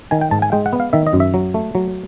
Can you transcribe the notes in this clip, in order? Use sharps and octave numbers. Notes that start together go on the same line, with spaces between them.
D#3 G#5
G5
G#2 A5
G#5
G#3 G5
F#5
B3
F5
D#3 E5
D#5
F#2
E5
F#3
A3
F#3